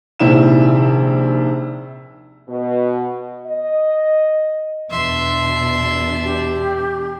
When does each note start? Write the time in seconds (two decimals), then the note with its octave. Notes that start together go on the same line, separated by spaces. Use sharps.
0.19 A#1 D#2 C3 E4 E6 E7
2.49 B2
3.47 D#5
4.90 E2 B2 D4 E5 C6
6.24 G4